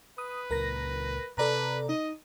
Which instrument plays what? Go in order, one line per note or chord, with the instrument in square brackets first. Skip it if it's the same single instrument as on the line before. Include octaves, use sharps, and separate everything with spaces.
[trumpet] B4 [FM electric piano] D#6
[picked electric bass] C#2 A#2 [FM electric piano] A#4 A#6
[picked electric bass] C3 [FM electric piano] A4 D5 A#5 [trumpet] B4
[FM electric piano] D#4 [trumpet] D#5